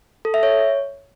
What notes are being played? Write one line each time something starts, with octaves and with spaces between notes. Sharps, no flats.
A4
E5
C#5